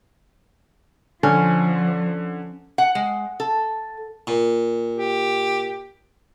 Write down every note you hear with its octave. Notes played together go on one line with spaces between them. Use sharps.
D3 F3 C#4
F#5
G#3
A4
A#2
G4